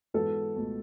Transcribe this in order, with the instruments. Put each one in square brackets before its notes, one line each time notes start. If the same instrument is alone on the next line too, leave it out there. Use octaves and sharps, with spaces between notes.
[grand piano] G#2 E3 G#3 B3 F#4 [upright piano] A4
[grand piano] C#2 B2 A3